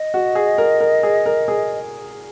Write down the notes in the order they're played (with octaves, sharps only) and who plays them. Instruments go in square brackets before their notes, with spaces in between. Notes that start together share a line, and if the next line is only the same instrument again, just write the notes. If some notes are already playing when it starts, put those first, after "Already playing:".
Already playing: [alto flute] D#5
[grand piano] F#4
G#4
A#4
A#4
G#4
A#4
G#4